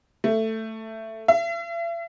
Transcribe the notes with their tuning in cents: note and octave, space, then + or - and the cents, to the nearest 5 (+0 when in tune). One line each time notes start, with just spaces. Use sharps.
A3 +10
E5 +45